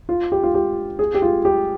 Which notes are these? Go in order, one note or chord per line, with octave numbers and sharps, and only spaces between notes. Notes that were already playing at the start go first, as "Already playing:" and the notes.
F4
G4
F4
G4
G#4
G4
F4
G4